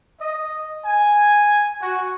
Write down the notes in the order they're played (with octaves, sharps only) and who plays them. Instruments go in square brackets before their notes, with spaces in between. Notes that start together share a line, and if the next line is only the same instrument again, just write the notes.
[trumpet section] D#5
G#5
F#4